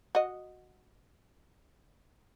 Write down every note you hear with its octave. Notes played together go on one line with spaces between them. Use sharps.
F#4 D#5